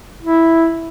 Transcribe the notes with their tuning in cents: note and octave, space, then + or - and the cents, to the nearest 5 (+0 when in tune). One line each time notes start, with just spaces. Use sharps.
E4 -5